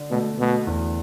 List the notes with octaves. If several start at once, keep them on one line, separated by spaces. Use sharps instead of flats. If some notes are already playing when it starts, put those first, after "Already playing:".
Already playing: D3 D4
B2 A3
B2 A3
E2